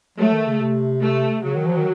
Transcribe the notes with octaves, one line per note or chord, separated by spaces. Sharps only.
F#3 A3
D#3
C#3
C3
A3
C#3 F#3
D#3
F3
D#3